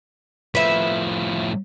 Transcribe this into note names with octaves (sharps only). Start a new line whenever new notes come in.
A2 F3 B4 E5